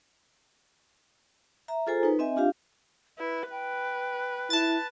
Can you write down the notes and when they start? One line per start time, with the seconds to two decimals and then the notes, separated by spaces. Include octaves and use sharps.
1.68 E5 A#5
1.87 F4 G#4 A4 C5 G#5 A#5
2.03 D#4 B4
2.19 C4 D#5 E5 G#5
2.36 D4 F4 G4 F5
3.19 E4 B4
3.51 B4 G5
4.50 E4 A5 A6